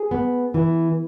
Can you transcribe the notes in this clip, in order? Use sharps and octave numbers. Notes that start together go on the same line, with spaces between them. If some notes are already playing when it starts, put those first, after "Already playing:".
Already playing: G#4
B3
E3